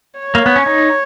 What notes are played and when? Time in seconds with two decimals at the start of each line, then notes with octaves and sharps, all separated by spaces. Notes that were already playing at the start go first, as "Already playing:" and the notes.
0.19 C#5
0.35 A#3
0.46 B3
0.56 C#4
0.66 D#4